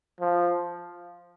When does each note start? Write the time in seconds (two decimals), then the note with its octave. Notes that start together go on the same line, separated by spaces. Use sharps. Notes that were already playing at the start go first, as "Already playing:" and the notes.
0.21 F3